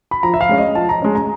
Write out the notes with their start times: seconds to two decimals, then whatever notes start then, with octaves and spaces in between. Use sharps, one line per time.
0.11 B5
0.23 F3 A#5
0.34 E5
0.41 F5
0.49 G#3 C#4
0.58 D#5
0.75 F3 A5
0.89 A#5
1.02 G#3 C#4
1.15 A#5